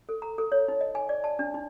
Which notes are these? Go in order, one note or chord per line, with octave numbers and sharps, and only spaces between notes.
A4
A#5
A4
C#5
D#4
D#5
G#5
D5
A5
D4
D#4